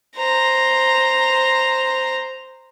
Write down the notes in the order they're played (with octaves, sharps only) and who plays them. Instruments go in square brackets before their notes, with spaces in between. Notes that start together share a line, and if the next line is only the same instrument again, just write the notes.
[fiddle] C5 A#5